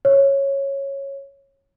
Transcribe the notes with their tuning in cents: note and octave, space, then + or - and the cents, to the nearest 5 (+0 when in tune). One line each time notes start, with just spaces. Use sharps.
C#5 -10